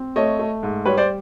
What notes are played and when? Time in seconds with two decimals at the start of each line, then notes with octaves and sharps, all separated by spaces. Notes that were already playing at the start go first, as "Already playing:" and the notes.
Already playing: C4
0.16 A3 C#5 D#5
0.39 A3
0.63 G#2
0.85 G3 B4 C#5
0.97 C5 D5